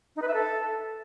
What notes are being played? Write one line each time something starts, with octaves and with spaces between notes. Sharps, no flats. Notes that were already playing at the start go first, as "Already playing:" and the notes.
D#4
B4
E5
A4